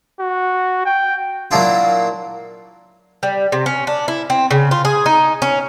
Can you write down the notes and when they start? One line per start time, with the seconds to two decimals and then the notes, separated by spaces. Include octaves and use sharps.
0.20 F#4
0.86 G5
1.51 A#2 F#3 A#3 D4 E4 F4
3.23 G3
3.52 C3
3.66 C#4
3.87 D4
4.08 E4
4.30 C4
4.51 C#3
4.71 F4
4.85 G#4
5.06 D#4
5.42 C#4